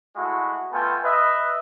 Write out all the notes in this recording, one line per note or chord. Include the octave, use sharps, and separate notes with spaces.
G#3 A3 E4 F#4
A3 B3 F4 A4 G5 G#5
B4 D#5 E5